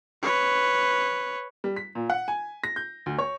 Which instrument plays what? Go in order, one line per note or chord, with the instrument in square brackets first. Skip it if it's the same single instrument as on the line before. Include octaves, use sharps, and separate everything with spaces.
[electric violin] B4 C#5
[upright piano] G3
B6
A#2
F#5
G#5
A#6
G6
D2
C#5